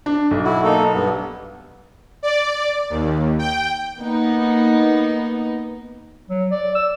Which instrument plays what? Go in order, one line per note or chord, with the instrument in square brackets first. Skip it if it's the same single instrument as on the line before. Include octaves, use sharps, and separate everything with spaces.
[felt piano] D4
B1
[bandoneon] E4 F#4
A#3 D#4 A4
G2 B3
[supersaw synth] D5
D#2
G5
[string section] A#3 B3 D#4
[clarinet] F#3
D5
E6